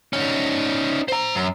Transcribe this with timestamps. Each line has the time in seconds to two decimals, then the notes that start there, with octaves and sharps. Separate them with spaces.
0.13 C#4 D#4
1.08 C5 A#5
1.35 F#2